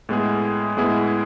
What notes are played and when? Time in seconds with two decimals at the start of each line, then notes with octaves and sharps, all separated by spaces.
0.09 A2 G#3 B3 E4 G#4
0.77 A2 G#3 B3 E4 G#4